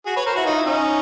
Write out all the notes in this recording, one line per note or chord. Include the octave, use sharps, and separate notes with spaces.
F#4 G#4
B4 C#5
A#4 C5
E4 F#4
D#4 F4
E4
C#4 D#4